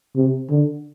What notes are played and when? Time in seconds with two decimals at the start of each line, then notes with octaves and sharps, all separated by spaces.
0.16 C3
0.50 D3